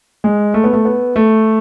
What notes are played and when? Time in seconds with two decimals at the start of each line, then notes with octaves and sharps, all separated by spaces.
0.24 G#3
0.54 A3
0.64 B3
0.73 A3
0.85 B3
1.16 A3